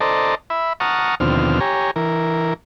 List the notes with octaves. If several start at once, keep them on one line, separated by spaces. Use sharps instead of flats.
A4 C5 D5 D#5 A5 A#5
E5 B5
F#5 A5 A#5 C#6 D#6 F6
D#2 B2 D3 F3 C4 F6
G4 C#5 G#5 A#5
E3 A#4